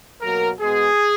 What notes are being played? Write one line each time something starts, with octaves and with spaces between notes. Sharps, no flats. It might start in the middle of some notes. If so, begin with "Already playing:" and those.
B2 F#3 A#3 A#4
B2 G#3 B3 G#4